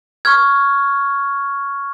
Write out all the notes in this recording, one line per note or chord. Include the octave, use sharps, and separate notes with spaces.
C#6 F6 G#6